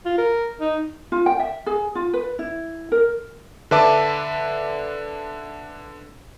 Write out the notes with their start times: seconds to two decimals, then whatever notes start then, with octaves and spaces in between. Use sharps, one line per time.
0.05 F4
0.18 A#4
0.60 D#4
1.12 F4
1.26 G5
1.39 E5
1.66 G#4
1.95 F4
2.13 B4
2.39 E4
2.92 A#4
3.71 D3 D4 B4 E5 A5 D6